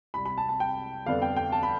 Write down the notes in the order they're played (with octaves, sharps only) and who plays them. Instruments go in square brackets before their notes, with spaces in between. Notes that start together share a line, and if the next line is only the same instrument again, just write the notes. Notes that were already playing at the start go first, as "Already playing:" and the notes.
[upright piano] C2 C3 G3 B5
B5
A5
A5
G5
F2 D3 G3 B3 D4 F5
G5
G5
A5
B5